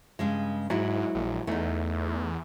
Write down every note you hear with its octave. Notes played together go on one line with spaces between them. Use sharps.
G2 C#3 G#3
G#2 F#3 G#3 E4
A#1
E2 A3 D#4